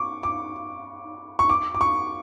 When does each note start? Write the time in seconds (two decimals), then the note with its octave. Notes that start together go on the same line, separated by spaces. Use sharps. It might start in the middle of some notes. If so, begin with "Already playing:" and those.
Already playing: C#6 D6
0.23 D6
1.39 C#6
1.50 D6
1.75 D6
1.81 C#6